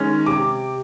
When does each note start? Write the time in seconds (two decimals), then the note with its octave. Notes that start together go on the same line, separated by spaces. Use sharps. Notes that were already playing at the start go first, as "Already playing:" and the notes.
Already playing: D#3 G#3 C#4
0.26 C3 D6